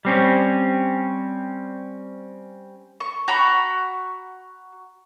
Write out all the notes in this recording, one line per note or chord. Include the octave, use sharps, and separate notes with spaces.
G3 C4 C#4
C#6
F#4 A#5 B5 C#6